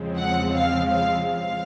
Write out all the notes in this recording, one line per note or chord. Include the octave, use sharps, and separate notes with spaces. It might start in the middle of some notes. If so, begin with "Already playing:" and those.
Already playing: E2 C#3 F3 G#3 C4
F#5
F5
F5
F5